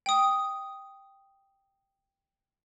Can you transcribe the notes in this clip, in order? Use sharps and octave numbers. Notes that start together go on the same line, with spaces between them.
G5 D#6